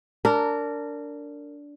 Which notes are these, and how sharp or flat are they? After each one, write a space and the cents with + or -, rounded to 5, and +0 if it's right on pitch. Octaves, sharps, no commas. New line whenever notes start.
D4 -15 A#4 -25